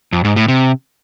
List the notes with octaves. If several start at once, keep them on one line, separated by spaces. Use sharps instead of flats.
F2
G#2
A2
C3